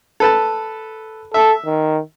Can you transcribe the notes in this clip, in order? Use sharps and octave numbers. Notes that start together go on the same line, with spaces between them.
A4 B4 A5
A4 E5
D#3